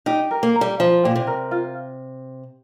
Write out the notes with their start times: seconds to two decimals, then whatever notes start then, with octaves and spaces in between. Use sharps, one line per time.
0.06 D#4 G4
0.31 A#4
0.43 A#3
0.56 A#5
0.61 G3
0.80 F3 F5
1.04 A#2 G4
1.15 C3
1.27 A#4
1.51 F4